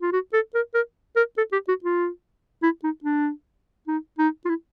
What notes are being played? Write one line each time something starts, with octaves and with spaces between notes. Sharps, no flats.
F4
F#4
A4
A#4
A#4
A#4
A4
G4
F#4
F4
E4
D#4
D4
D#4
D#4
F4
E4